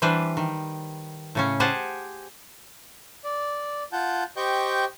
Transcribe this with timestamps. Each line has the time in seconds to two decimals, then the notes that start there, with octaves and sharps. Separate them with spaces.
0.02 E3 G3 D4 B4 C5
0.37 D#3
1.35 A2 C#3 C#4
1.60 G4 G#4 C5 F#5 A5
3.24 D5
3.93 F4 F#5 A5 G6
4.37 G4 C5 D#5 G5 C#6 G6